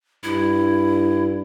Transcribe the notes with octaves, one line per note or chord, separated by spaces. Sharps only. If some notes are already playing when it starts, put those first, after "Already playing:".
G2 E4